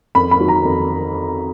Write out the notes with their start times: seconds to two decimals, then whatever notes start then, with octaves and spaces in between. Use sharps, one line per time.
0.15 F2 B5
0.31 B5
0.40 D#3 F#3
0.48 A#5
0.65 F2